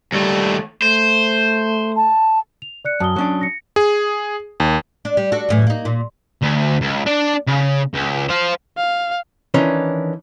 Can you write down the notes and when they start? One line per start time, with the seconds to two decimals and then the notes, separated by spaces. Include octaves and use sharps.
0.12 D#2 G3 A3
0.82 A3 C5
1.96 A5
2.62 F7
2.85 D5 F#6 C#7
3.00 F#2 A5 D#6 G7
3.16 F#3 C#4 D4
3.41 A#6 C#7
3.76 G#4
4.60 D#2
5.05 D4
5.17 G3
5.32 D4 F#4 A4
5.49 F#2 A2 E3
5.67 A#3 D#4
5.85 A#2
6.42 D2
6.81 C#2
7.06 D4 D5
7.47 C#3
7.94 C#2
8.30 C5 F5
8.77 F5
9.54 D#3 E3 C#4 D4